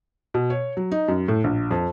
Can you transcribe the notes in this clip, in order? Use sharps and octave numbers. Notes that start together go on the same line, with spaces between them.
B2
C#5
F#3
D#4
F#2
A2
A#1
F2